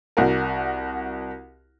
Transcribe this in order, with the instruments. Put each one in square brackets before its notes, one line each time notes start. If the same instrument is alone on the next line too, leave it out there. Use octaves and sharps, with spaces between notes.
[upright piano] C2 F#4 A#4